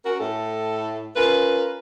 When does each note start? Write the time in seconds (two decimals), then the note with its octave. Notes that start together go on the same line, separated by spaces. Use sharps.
0.04 C#4 F#4 A#4
0.20 A2 A4
1.16 C#4 F4 A#4 B4